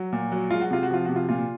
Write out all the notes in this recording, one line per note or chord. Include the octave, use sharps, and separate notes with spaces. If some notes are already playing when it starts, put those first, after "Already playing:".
Already playing: F#3 F#4
A#2
F#3
G#3 F4
F#4
C3 F4
F#4
F3 F4
C3 F#4
F4
A#2 F4